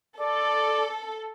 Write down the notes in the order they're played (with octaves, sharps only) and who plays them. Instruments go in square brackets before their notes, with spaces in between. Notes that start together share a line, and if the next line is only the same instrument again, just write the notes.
[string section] A4 [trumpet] D5